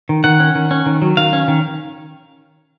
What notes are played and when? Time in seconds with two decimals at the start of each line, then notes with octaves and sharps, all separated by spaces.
0.09 D#3
0.24 D#3 F#5
0.40 C#4
0.55 D#3
0.71 C#4
0.86 D#3
1.02 F#3
1.17 D#3 F5
1.33 C#4
1.48 D#3